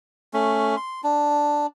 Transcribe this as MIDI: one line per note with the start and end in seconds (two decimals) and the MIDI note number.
0.33 0.76 57
0.33 0.76 61
0.77 1.01 84
1.04 1.66 62